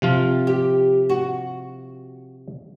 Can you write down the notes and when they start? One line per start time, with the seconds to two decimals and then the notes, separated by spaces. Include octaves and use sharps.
0.02 C3 F3 F4
0.47 G4
1.09 F#4